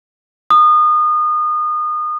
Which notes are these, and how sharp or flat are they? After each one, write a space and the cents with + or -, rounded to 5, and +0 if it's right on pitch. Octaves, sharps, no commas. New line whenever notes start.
D#6 -30